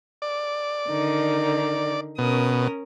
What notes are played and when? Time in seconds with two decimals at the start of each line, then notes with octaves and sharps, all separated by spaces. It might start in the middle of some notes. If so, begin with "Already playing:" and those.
0.22 D5
0.90 D3 D#3 D#4
2.18 B2 C#4 A#4 D#6